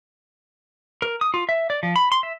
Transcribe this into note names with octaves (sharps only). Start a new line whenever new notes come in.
A#4
D#6
F4
E5
D5
F3
B5
C6
E5